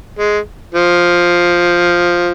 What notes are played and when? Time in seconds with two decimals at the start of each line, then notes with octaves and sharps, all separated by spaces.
0.19 G#3
0.74 F3